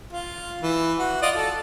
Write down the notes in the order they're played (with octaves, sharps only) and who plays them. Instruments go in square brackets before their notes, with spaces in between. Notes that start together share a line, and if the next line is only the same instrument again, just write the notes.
[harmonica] F4
E3
F#4
F4 D5 D#5
A4